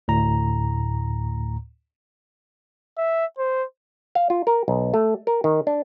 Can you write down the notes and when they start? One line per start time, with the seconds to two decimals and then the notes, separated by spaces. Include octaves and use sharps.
0.08 D2 A2 A#5
2.98 E5
3.38 C5
4.15 F5
4.30 F4
4.47 A#4
4.68 B1
4.94 A3
5.27 A#4
5.44 D#3
5.67 D4